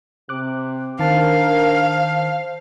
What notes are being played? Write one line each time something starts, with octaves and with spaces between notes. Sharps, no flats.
C3 D6 F#6
D#3 D4 A#4 C5 F5 A5